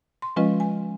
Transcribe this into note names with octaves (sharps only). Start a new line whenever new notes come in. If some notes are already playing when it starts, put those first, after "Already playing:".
C6
F3 G#3 C#4 F4 B4 D#5
G#5